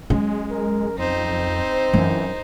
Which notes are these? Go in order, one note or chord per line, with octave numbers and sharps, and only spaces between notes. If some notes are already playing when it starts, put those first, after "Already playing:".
F#3 G#3 C#4
A#4
F2 C4 D#4 C5
F#2 E3